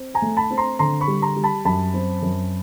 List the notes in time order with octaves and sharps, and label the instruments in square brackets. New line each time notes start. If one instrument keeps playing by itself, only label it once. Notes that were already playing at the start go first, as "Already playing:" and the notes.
Already playing: [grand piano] C4
G#5 A#5
A3
A5 B5
C4
A#5 C6
D3 A#5 C6
B5 C#6
G3
A#5 C6
G3
A5 B5
F#2 A5 B5
C4
F#2